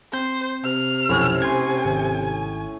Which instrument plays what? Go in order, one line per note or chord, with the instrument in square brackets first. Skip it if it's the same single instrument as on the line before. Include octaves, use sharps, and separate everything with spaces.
[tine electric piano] C4 G6 [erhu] C5
[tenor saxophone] C3 [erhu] F6
[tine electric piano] B1 F2 [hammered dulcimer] A2 C#4
[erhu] G#5 [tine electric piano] C6 G#6
[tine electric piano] G#1
[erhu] G#5